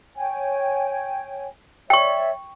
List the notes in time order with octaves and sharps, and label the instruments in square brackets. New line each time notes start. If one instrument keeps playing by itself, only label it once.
[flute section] C#5 G5 G#5
[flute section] C#5 D5 E5 [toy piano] G5 C#6